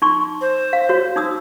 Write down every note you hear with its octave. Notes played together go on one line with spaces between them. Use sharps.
D#4 C6 C#6
C5
F5
F#4 C#5
D#4 D#6 E6